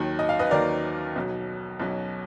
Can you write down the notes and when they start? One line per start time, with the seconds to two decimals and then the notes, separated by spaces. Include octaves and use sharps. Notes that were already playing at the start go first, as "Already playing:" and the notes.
Already playing: D#2 D#3 F#3
0.19 D#5
0.29 F5
0.39 B4 D#5
0.51 D#2 D#3 F#3 A#4 D5
1.16 B1 B2 F#3
1.80 B1 B2 F#3